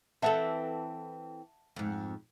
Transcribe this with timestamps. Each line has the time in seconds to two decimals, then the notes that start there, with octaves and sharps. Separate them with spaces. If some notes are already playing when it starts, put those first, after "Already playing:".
0.22 E3 C4 A4 E5 F#5 A5
1.76 F2 G#2